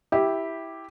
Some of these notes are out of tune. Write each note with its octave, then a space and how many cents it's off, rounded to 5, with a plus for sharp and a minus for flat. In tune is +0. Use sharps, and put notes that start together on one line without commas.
E4 -10 G4 +0